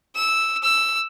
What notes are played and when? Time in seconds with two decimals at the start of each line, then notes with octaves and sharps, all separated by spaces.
0.16 E6
0.63 E6